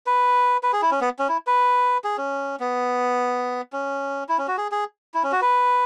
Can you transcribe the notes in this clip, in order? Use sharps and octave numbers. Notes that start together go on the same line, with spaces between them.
B4
B4
G#4
E4
C#4
B3
C#4
E4
B4
G#4
C#4
B3
C#4
E4
C#4
F#4
G#4
G#4
E4
C#4
F#4
B4